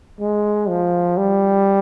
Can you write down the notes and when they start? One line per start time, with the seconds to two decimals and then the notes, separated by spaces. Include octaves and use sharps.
0.20 G#3
0.69 F3
1.18 G3